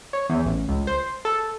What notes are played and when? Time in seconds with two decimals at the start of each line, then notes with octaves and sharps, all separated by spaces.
0.13 C#5
0.29 E2
0.45 A1
0.69 C#2
0.87 C5
1.25 A4